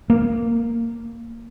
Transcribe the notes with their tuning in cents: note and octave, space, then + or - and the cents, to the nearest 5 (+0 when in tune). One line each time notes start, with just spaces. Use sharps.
A#3 -10